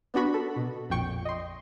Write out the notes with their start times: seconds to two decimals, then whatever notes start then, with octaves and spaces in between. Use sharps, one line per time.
0.14 B3 D4 F#4 B5 C#6
0.34 A4
0.56 B2
0.90 A#1 F2 A#2 G5 C#6 C#7
1.25 D#5 C6